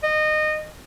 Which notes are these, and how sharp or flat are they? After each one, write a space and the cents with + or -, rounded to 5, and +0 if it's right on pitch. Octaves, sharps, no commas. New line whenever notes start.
D#5 -25